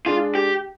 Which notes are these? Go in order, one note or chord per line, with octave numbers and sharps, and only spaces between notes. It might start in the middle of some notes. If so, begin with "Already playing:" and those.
G#3 D4 F4 G#4
G4